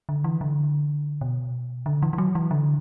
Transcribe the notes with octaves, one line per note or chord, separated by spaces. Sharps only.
D3
E3
D3
B2
D3
E3
E3
F#3
E3
D3